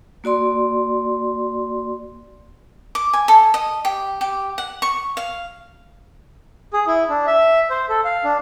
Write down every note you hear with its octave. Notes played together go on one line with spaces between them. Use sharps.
A#3 F#4 D5 C6
D6
G#5
A4
D#5
G4
G4
F#5
C#6
F5
G#4
E4
D4
E5
C5
A4
F5
D4